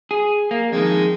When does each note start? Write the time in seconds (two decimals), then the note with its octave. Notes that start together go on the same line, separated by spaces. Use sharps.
0.11 G#4
0.51 A#3
0.72 F2 D#3 G#3